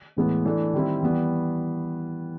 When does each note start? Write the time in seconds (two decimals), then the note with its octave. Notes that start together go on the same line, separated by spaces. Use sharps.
0.17 A2 E3 G#3 B3
0.46 E3 A3 D4
0.74 D#3 G3 C4 E4
1.03 E3 G3 B3